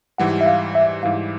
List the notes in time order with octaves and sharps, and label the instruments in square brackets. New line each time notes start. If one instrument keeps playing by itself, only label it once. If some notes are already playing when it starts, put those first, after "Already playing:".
[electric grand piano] G#2 E3 G3 [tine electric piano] F#5
[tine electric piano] E5
F5
E5
[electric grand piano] G#2 E3 G3 [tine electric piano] F5